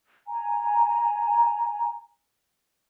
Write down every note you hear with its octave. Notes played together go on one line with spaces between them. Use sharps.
G#5 A#5